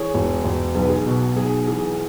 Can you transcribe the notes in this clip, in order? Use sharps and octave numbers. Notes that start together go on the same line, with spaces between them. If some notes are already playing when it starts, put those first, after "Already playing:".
Already playing: E3 G#4 C#5
E1
E1
B1 G#4
B4
G#4
B2 F#4
B1 G#4
E3 G#4